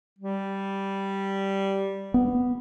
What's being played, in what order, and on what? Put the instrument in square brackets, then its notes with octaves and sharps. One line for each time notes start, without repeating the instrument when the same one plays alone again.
[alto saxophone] G3
[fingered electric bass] B3